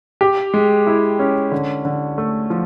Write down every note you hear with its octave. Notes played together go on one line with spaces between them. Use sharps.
G4
G#3
E4
C#4
D3
D3
A3
F3